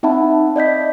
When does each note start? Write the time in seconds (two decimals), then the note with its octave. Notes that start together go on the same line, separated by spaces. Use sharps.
0.03 C4 D#4 E5 F#5 A5 B5
0.56 D5 D#5 G6 B6